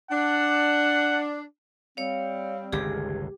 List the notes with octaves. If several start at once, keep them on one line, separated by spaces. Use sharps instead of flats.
D4 F#5
G3 C4 C#5 F5
G1 C#2 D#3 G4 G#4